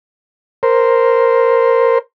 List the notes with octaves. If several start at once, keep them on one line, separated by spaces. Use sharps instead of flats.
A#4 C5